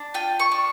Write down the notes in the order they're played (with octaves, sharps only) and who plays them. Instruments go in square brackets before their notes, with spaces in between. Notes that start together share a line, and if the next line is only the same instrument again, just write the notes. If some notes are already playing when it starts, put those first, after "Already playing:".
Already playing: [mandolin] D4
F4 G5
C#6
D4